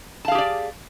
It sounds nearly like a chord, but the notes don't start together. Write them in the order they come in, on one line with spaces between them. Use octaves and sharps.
A5 F5 G#4 G4 D5